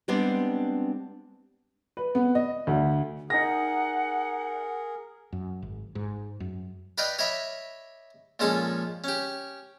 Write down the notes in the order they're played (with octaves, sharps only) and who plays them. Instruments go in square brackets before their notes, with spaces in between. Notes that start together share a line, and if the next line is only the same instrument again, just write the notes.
[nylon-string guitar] G3 G#3 B3 C4 D4
[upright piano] B4
B3
D#5
D2
[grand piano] D#4 A#6 [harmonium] G#4 A#4 [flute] F#5
[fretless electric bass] F#2
G#1
G#2
F#2
[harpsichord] B4 D5 D#5 F5 G5
C#5 D#5 E5 B5 D6
A#2 F3 G#3 C#4 G#4 A4
C#4 G4